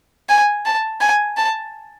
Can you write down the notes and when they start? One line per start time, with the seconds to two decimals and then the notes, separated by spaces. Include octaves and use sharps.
0.29 G#5
0.65 A5
1.01 G#5
1.37 A5